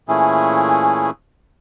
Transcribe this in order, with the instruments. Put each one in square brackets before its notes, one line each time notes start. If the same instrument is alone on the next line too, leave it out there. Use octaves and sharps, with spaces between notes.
[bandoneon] A#2 E3 A3 C#4 E4 G#4